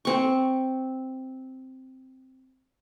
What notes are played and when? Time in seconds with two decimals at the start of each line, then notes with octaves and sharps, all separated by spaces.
0.05 C4 C#6